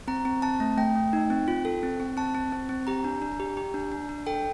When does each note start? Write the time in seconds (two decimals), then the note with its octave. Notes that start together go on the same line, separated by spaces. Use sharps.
0.08 C4 A#5
0.25 C4
0.42 C4 A5
0.60 A3
0.78 A3 G5
0.96 A3
1.13 D#4
1.30 C4
1.48 F4
1.65 A4
1.83 C4
2.00 C4
2.17 C4 A5
2.35 C4
2.52 C4
2.69 C4
2.87 G4 A#5
3.04 D4
3.22 D4
3.40 G4
3.57 G4
3.74 D4
3.92 D4
4.09 D4
4.27 A4 G5